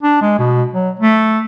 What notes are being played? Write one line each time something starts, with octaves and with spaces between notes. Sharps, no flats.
D4
G#3
B2
F#3
A3